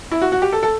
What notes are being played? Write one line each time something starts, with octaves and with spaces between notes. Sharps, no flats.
E4
F#4
F#4
G4
A4
A4